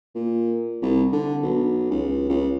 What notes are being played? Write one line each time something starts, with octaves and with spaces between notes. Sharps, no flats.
A#2
C2
D3
B1
C#2
C#2